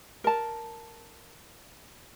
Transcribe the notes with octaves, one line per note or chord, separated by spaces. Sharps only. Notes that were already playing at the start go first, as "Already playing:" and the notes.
A#4 A5